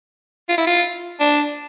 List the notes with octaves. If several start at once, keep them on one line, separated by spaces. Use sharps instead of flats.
F4
E4
F4
D4